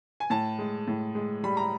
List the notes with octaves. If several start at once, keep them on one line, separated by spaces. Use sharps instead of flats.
G#5
A2 A5
G#3
A2
G#3
G3 B5
A#5